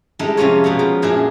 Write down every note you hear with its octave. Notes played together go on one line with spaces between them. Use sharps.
G3 G#3 D#4 E4 A4 A#5
F2 C3 C#4 F4 C#5
B2 B3 G#4 A#5
F3
F#2 A#2 D4 E4 G#4